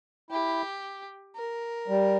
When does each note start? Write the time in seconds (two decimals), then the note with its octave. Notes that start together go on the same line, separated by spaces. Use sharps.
0.31 E4 G4
1.36 A#4
1.88 G3